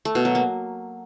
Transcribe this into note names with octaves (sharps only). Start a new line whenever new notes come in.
A3
B2
F#3
A#3